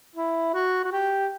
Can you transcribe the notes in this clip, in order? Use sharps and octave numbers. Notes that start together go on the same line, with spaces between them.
E4
F#4
F#4
G4